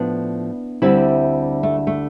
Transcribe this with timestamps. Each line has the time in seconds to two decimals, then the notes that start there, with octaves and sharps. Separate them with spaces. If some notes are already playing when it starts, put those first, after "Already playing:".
Already playing: A2 F3 B3 D4
0.82 D2 D3 G3 C4 E4
1.63 A3
1.87 A3